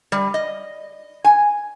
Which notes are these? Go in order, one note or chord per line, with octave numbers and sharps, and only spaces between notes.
G3
D#5
G#5